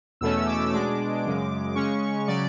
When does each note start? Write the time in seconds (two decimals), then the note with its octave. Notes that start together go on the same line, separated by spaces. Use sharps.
0.21 E2 B2 A3 C#4 E6
0.41 E6
0.47 D6
0.73 B2 G#3 D4 D6
1.25 F#2 C#3 G#3
1.75 C#3 G#3 C#4 C#6
2.28 C#3 F#3 C#4 D5